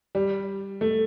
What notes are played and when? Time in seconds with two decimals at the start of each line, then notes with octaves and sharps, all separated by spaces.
0.15 G3
0.81 A3